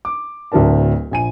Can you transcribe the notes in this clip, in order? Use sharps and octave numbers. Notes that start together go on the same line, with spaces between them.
D6
D1 D2 F#3 D4 A#4 A5
A#1 G#5 D#7